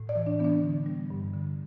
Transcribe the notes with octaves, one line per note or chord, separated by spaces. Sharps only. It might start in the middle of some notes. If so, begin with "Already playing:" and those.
Already playing: A2
D5
E3
D4
E3 B3
D4
D3
G3
G2
D3